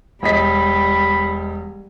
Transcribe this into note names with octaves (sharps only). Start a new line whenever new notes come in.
E1 G3 D#5 B5 B6